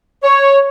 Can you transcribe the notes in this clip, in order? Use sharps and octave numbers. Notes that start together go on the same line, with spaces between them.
C#5